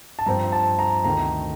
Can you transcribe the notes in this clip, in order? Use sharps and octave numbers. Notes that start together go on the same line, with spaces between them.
A5
G2 F3 C4 A#5
A5
A#5
D2 C3 D#3 A3 A#5